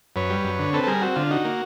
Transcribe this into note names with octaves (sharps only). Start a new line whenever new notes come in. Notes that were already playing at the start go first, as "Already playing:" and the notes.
F#2 B4 C#5
G3
F#2
D3
C4 A4 B4
A4
G3 G#4 A#4
C4 F#4
D3 F4
D#4 F#4
A#3